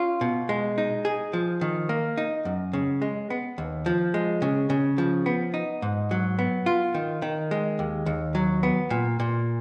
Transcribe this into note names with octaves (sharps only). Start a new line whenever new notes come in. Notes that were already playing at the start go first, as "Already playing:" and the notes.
Already playing: C#4 F4
B2
G#3
D#4
G#4
F3
D#3
A#3
D#4
F#2
C#3
G#3
B3
D#2
F3
G#3
C#3
C#3
F3
B3
D#4
G#2
F#3
B3
F4
D#3
D#3
G#3
D#2
D#2
F#3
B3
A#2
A#2